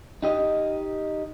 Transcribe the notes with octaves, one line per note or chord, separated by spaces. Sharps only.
D#4 G4 D#5